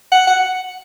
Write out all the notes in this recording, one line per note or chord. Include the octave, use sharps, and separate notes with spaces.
F#5
F#5